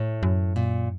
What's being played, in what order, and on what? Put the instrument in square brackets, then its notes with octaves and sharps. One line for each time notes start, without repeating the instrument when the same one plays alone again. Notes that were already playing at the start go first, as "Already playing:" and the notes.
Already playing: [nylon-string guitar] A2
[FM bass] F#2
[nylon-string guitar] A#2